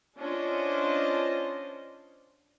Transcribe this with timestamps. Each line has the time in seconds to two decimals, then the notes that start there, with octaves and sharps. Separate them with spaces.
0.17 C#4 D4 F4 C5 D#5